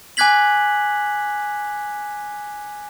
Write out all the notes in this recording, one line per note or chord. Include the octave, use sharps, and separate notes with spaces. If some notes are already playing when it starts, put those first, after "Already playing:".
G#5 D6 F#6 G#6 B6 F#7